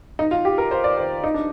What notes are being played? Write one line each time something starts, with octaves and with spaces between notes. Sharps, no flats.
D#4
F4
G4
A#4
C5
D5
C5
D#4
D4